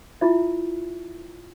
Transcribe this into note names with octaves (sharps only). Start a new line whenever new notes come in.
E4 F4 E5